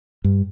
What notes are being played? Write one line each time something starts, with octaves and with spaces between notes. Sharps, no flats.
G2